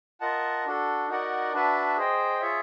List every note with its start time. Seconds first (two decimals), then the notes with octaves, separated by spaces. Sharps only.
0.21 F4 A#4 D#5 F#5 A5
0.65 D4 F#4 A4
1.08 D#4 F#4 A#4 D5 F#5
1.53 D4 F#4 B4 E5 A5
1.97 G#4 C5 D#5 G5
2.40 F4 G#4 C#5 E5